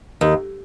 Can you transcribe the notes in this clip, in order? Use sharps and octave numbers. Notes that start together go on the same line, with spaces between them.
D#2